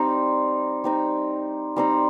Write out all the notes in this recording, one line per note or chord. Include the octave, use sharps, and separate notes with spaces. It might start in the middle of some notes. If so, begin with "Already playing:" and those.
Already playing: G3 C4 D#4
G3 C4 D#4
G3 C4 D#4